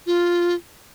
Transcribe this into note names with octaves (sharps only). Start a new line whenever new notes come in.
F4